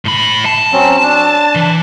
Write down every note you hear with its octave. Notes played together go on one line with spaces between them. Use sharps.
A2 B5
A5
F#3 C4 C#4
D4
E3